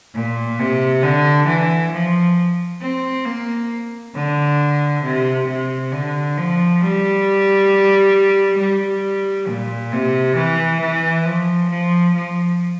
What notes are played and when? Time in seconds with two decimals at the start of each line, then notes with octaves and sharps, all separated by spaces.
0.15 A#2
0.59 C3
1.03 D3
1.47 E3
1.92 F3
2.81 C4
3.26 A#3
4.15 D3
5.03 C3
5.48 C3
5.92 D3
6.37 F3
6.81 G3
8.59 G3
9.48 A#2
9.92 C3
10.36 E3
10.81 E3
11.25 F3
11.70 F3
12.14 F3